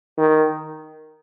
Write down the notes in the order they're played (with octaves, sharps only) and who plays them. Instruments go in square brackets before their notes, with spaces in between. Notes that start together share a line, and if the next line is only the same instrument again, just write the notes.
[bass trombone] D#3